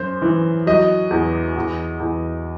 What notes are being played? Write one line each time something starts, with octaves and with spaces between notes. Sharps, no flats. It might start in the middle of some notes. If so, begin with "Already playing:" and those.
Already playing: F#2 C5
E3
F#3 D#5
E2
E2
E2